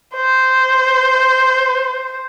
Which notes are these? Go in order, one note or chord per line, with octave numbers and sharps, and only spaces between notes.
C5